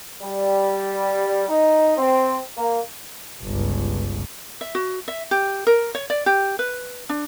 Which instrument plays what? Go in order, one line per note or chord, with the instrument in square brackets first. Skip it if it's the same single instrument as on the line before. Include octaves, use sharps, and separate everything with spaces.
[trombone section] G3
D#4
C4
A#3
[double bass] G1 C#2
[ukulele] E5
F#4
E5
G4
A#4
C#5
D5
G4
B4
D4